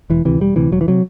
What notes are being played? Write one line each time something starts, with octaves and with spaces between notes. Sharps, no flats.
E1 E3
D2 C3 E3
E1 G3
D2 C3 E3
E1 F#3
E3
C3 F#3